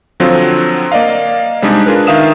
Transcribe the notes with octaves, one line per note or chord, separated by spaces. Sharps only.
D3 F3 F#3 C4 F4
A#3 D5 D#5 F5
C3 G3 G#3 D4 D#4 G#4
D4 F4 G#4 A#4 B4
D#3 A#4 E5 F5 D#6 E7